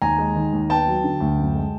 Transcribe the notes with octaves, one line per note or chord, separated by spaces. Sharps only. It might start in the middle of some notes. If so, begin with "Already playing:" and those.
D#2 G#5 A#5
G#3
D#3
D#2
B3 G5 A5
F#3
D3
D2
F#2
G#3